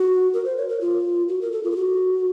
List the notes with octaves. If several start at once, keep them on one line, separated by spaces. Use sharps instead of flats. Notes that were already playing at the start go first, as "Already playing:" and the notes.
Already playing: F#4
A#4
C5
C#5
A#4
F4
F#4
A#4
A4
F4
A4
F#4